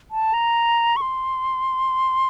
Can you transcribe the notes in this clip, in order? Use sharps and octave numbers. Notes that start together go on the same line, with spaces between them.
A5
A#5
C#6
C6